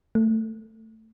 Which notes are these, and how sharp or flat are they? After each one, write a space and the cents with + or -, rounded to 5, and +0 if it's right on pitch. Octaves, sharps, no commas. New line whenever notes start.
A3 +15